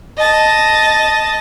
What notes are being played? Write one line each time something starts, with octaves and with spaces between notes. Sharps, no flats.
D#5 A5